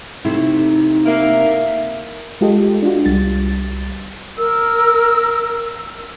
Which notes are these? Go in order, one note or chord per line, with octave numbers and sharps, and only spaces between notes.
C3 A3 D#4 E4
A#3 E5
G#3 F4 G4 A4 D#5
D4 F4 F#4
C2 G3 A6
A#4 E6